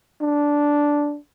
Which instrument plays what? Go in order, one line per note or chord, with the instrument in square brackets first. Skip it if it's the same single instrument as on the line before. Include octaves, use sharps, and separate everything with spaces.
[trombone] D4